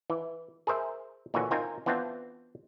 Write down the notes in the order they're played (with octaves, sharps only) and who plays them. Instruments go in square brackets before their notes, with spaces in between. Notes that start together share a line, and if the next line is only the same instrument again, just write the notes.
[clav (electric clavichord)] E3
G#4 A#4 C5 E5
A#2 D3 E3 F#4 C#5 G#5
C4 D#4 F4 A#4 G#5
E3 B3 C4 D4 F4